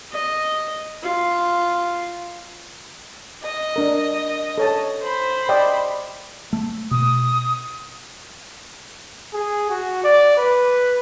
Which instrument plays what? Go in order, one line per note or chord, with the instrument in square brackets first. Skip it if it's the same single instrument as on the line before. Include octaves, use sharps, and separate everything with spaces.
[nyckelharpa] D#5
F4
[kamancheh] D#5
[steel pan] D4 A#4
A4 C#5 A5
[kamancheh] C5 B5
[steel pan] D5 D#5 G5
[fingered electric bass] A3
[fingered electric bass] B2 [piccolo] D#6
[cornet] G#4
F#4
D5
B4